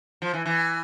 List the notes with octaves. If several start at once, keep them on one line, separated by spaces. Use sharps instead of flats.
F3
E3
E3